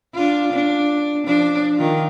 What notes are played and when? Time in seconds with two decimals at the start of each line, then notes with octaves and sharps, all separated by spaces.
0.14 D4 F4
0.52 D4
1.26 F3 D4
1.76 D#3 F4